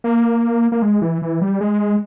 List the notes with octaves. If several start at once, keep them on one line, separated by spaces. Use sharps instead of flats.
A#3
A#3
G#3
E3
E3
G3
G#3